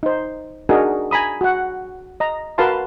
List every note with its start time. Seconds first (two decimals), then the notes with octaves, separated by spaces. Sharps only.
0.03 D#4 C5
0.69 D4 D#4 F#4 G#4 A#4
1.11 G#5 A#5 B5 D#6
1.41 F#4 F#5
2.20 D#5 A#5
2.58 F#4 A#4 B4 F5 A5 C6